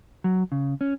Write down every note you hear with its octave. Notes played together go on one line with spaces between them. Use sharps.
F#3
C#3
C#4